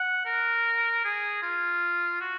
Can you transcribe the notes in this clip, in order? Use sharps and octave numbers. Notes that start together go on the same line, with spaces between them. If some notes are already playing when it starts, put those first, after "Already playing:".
Already playing: F#5
A#4
G#4
F4
F#4